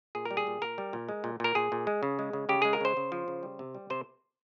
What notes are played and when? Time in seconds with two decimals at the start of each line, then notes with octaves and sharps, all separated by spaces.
0.15 A#2 G#4
0.25 A#4
0.31 G3
0.37 G#4
0.47 A#2
0.62 A#2 A#4
0.78 G3
0.93 A#2
1.09 G#3
1.24 A#2
1.40 A#2 A#4
1.55 A#2 G#4
1.72 A#2
1.87 G#3
2.03 C#3
2.19 G#3
2.33 C#3
2.49 C#3 G4
2.62 G#3 G#4
2.73 A#4
2.81 C#3 C5
2.97 C#3
3.12 F3
3.28 C#3
3.43 G3
3.59 C3
3.75 G3
3.90 C3 C5